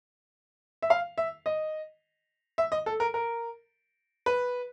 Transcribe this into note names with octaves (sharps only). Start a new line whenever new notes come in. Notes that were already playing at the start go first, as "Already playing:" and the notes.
E5
F5
E5
D#5
E5
D#5
A4
A#4
A#4
B4